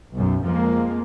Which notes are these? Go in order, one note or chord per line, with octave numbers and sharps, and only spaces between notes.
B1 F#2
F2 F3 G#3 A#3